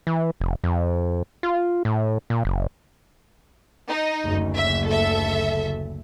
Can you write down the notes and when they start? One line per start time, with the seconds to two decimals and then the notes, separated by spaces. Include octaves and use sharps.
0.07 E3
0.40 F1
0.64 F2
1.43 F4
1.85 A2
2.30 A#2
2.45 F#1
3.89 D#4
4.25 F#1 D2 C#3
4.56 E5
4.86 A4 E5